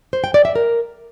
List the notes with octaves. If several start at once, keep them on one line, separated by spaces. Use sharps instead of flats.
C5
G5
D5
E5
A#4